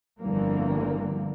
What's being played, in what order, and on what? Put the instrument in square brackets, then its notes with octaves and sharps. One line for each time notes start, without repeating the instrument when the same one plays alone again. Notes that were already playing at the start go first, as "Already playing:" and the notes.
[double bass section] G1 F2 D3 E3 G3 A#3